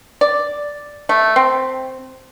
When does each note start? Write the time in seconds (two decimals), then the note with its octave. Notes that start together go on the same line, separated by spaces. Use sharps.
0.21 D5
1.09 A3
1.36 C4